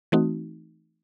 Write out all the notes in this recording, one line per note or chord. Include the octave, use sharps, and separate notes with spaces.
E3 A3 C4 D#4 F#4